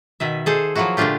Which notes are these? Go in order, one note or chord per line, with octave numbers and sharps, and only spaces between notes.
B2 D#3 E5
G#4 A4 C5
F3 F#3 A#3 E4 F#4
A#2 D3 A3 D4 F4 G4